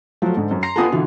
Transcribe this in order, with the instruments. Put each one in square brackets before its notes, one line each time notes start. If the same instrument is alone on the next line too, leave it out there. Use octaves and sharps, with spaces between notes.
[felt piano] F3 A3 [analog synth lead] F#3
[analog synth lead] G#2 [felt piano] D3
[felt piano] F#2
[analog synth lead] A#5 [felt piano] C6 C7
[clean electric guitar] B3 F4 A4 [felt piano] F#5 G#5 D#6
[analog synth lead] B2 [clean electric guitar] D3 E3 [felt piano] F4 F#4